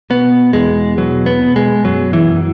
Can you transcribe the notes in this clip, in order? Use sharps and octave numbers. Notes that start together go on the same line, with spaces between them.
B2 B3
E2 G#3
B2 F#3
B3
B2
G#3
F#2 F#3
E3
F#2